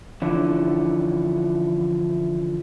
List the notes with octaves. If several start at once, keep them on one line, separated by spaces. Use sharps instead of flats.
D3 E3 F3 C#4 D4 E4